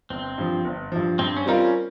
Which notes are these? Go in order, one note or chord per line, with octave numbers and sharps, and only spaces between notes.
G1 C4
G2 F3
G1
G2 F3
G2 C4
C#4
G3 C4 D#4 F4 A#4
C#4